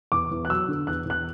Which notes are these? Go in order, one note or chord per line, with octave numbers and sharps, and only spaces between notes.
E2 D6
E2
F#6
F#3 E6
D3
E2 F#6
E2 F#6